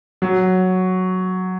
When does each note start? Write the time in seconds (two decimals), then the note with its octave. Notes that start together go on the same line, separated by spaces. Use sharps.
0.22 F#3